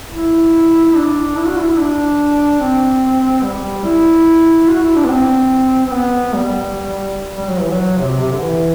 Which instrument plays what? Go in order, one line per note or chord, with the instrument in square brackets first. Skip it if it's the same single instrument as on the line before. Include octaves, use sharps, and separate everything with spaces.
[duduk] E4
E4
D4
E4
F#4
E4
E4
D4
C4
G3
E4
F#4
E4
D4
B3
C4
C4
B3
G3
G3
F#3
E3
F#3
C3
C3
D3
E3